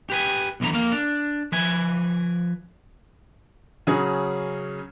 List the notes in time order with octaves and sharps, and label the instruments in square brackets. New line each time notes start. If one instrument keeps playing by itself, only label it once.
[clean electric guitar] G4 B4 G#5
B1 E2 D3 E3 B3 A#5
F2 A#3 F5
D4
F3 B4 G#5
[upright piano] C#3 F#3 C#4 G#4